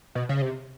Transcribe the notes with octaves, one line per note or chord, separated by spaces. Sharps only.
B2
C#3
C3